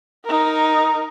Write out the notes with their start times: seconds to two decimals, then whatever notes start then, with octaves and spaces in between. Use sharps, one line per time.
0.25 D#4 A#4